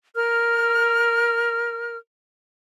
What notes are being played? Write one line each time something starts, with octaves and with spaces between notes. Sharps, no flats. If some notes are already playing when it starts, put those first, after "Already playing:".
A#4 F6